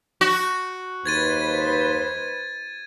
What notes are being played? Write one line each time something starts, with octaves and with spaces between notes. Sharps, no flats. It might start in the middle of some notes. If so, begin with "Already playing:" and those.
F#4
D#2 D#4 B4 C5 G#6 A6 D#7